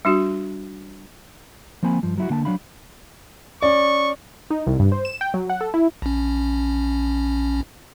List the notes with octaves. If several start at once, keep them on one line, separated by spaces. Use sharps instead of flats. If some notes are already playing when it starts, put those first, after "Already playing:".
G3 D4 F#4
F3 A#3 C4 G#5 B5
G2 F3
F#3 E4 F#4
D3 A#3 G5 A5
F#3 D4 F5 B5
C#4 D5 C#6
D#4
C2
G2
C5
E7
G5
F#3
F#5
A4
E4
A#1 C#4